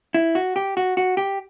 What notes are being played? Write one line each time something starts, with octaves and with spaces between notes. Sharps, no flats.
E4
F#4
G4
F#4
F#4
G4